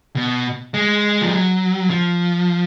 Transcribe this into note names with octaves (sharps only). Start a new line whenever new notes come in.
B2
G#3
F3
F#3
F3